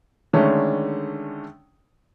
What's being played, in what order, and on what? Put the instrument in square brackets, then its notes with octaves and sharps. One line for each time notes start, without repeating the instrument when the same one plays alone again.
[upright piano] D3 D#3 G#3 A3 C#4 D4